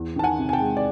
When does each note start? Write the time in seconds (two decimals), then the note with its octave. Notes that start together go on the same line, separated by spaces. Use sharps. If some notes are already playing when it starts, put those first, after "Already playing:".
Already playing: E2
0.16 D#3 A5
0.23 F#5 G#5
0.38 C3
0.49 G#5
0.53 G5 A5
0.60 G#3
0.77 D5